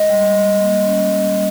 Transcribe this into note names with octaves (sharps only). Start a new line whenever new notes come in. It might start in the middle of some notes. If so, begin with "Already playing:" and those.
Already playing: G#3 D#5
G3
G3
A#3
C#4
G3